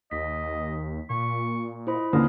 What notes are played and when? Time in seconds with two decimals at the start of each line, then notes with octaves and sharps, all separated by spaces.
0.11 D#2 D#5 B6
1.10 A#2 C#6
1.87 E4 C5 D#5 B5
2.13 D#1 A#2 D3 E4 A#4 B4 D#6